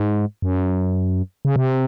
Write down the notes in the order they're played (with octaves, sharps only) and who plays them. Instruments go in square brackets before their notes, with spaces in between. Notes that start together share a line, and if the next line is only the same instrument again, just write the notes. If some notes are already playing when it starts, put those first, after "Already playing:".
Already playing: [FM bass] G#2
F#2
C#3
C3